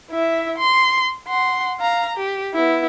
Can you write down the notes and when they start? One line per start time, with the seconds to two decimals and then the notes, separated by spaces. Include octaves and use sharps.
0.11 E4 E5
0.58 C6
1.28 F#5 C6
1.80 F5 A#5
2.17 G4
2.54 B3 E4